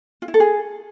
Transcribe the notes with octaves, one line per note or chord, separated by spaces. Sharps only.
F4
E4
A4
G#4